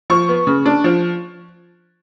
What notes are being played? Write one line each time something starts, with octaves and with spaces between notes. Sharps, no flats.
F3 C#6
B3
C#3
D4
F3